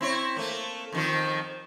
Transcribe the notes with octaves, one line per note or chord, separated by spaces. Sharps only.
C4 E4 C#5
A3 A#3
F2 D#3 F3